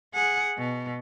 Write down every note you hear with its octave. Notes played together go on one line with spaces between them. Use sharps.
G#4 F#5
B2